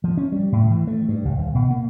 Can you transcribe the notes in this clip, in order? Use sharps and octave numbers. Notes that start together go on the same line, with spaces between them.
F3
C#4
G3
A2
E3
A3
G2
C#2
D#1
B2
A#3